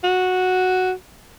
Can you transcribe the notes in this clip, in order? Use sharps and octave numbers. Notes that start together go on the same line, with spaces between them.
F#4